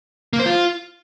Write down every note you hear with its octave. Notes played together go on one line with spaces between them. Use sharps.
A#3
C5
F4